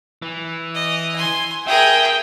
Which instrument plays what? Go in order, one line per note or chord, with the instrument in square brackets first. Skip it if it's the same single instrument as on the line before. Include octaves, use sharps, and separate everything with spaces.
[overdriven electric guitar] E3
[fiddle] D#5
G#5 C6
[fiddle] G#4 A#4 [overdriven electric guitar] E5 [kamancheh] G5